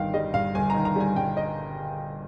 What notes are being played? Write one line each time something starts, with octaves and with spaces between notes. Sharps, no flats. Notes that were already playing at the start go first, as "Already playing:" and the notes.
Already playing: G1 G2 D#3 F5 G5
G3 D#5
G2 F5
G1 G#5
D#3 A#5
A#5
G3 G#5
G2 G5
D#5